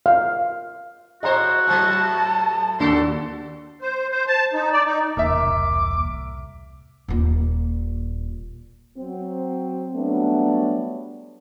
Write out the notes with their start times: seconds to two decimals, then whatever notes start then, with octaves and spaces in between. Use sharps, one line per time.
0.06 F5
1.23 A2 F#4 C5 D#5 A#5 C6
1.67 A2 F#3 A5
2.79 D#2 D#3 D4 F#4 A4 C6
3.82 C5
4.11 C5
4.27 A5
4.54 D#4
4.72 D5
4.85 D#4
5.17 E1 C2 A2 A#3 A#4 E5 D6
7.08 D#1 A#2
8.98 F#3 C4
9.94 F#3 G3 A3 B3 D4